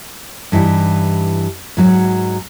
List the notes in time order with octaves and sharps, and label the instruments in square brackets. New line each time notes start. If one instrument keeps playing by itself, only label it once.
[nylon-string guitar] G2 E3 D#4 G4
G#2 F#3 F#4